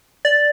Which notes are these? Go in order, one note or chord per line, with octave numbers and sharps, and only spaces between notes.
D5